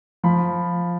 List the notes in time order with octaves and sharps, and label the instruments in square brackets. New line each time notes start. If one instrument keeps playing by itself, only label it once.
[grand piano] F3 B5